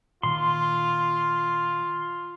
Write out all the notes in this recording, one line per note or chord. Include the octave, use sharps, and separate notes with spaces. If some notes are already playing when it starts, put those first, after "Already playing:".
A#2 D#3 F4 C6